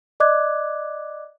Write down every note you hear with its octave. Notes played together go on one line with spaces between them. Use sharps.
D5 D#5 D6 F#6 G#6